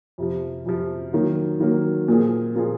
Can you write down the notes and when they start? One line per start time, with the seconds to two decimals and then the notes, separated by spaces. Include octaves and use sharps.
0.18 F2 C3 F3
0.66 F2 C3 F3
1.13 D#3 F#3 A#3
1.60 D#3 F#3 A#3
2.08 A#2 F3 A#3 F4 G#4
2.55 A#2 F3 A#3 F4 G#4